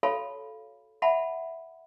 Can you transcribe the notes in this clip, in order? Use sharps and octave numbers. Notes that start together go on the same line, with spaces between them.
F#4 A4 C#5 F5 A5 B5
E5 F#5 A5 B5